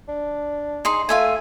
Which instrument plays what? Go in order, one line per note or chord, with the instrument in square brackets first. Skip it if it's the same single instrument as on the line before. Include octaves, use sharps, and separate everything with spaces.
[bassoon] D4
[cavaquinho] D#4 G#4 C6
[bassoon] A3 [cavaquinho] F4 E5 G#5